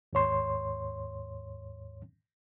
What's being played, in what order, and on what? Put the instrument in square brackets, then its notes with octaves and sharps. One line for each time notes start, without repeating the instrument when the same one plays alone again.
[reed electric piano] D#2 G#2 C#5 C6